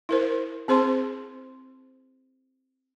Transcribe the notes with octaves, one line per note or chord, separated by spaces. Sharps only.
E4 A#4 C5
C4 G#4 C5 C6